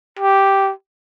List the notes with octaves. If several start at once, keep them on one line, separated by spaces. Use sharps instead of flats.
G4